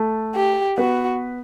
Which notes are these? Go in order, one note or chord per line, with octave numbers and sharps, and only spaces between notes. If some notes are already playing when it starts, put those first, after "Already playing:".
Already playing: A3 A4
G4
B3 F#4 B4